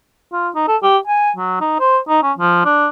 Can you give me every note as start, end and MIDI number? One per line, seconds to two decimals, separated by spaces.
0.33 0.49 65
0.55 0.64 63
0.68 0.77 69
0.83 0.98 67
1.07 1.31 80
1.36 1.57 54
1.61 1.79 63
1.80 1.98 72
2.09 2.22 63
2.23 2.33 61
2.39 2.63 53
2.65 2.88 62